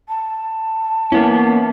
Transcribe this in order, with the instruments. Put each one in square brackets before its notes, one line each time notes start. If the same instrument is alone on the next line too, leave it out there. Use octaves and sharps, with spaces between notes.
[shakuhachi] A5
[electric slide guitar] A#3 B3 C#4 [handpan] E4